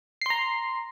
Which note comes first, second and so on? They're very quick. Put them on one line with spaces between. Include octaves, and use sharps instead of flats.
C7 C6 A#5